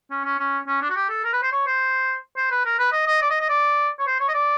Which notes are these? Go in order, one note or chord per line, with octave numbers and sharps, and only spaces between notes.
C#4
C#4
C#4
C#4
D4
F#4
G4
A4
A#4
B4
C5
C#5
C5
C5
B4
A#4
B4
D#5
D#5
D5
D#5
D#5
D5
C#5
C5
C#5
D#5
D5